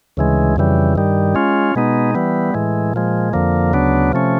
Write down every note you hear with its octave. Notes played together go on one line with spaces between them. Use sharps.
D2 C#3 E3 G#3
F2 C#3 E3 G3
G2 D#3 G3
G#3 C#4 F4
B2 G#3 B3 D#4
E3 G3 B3
A2 E3 G#3
A#2 F3 G#3
F2 D3 F3 A#3
D2 C#3 F#3 B3 D4
C3 F3 A3 C#4